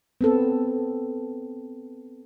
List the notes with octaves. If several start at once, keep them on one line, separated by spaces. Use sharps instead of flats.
B3 C4 A4